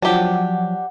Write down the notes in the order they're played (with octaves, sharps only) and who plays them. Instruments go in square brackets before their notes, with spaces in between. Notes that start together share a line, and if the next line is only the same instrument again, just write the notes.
[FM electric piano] F3 F#3 [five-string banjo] D4 G4 [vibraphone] F#5